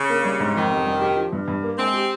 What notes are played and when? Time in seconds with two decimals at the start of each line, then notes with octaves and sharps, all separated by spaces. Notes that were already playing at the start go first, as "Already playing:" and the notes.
Already playing: C#3
0.09 A#3
0.25 G3
0.40 G#2
0.55 F2 D#3
0.71 F1
0.86 G3
1.02 G4
1.16 F3
1.33 G2
1.48 G2
1.63 A#3
1.78 G#3 C4
1.94 G4